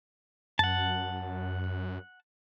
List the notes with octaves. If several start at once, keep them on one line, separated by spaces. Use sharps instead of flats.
F#2 F#5 A5